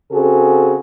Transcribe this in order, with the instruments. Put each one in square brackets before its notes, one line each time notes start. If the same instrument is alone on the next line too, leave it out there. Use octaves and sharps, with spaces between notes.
[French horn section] C#3 C4 F#4 G#4 A4